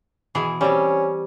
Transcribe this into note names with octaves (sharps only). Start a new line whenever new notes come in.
B2 E3 G#4
G3 C4 C#4